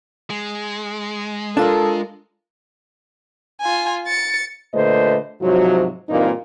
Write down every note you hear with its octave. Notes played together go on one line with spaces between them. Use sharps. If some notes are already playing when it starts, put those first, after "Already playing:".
G#3
D4 F4 A4 A#4
F4 G#5
A6 C#7
A#2 D3 A3 B4 C5 D#5
G#2 C3 F3 F#3
G2 A#2 E3 A#3 C4 D#4